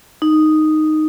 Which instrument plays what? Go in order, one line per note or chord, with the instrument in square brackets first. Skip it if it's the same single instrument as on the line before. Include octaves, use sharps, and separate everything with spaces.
[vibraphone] D#4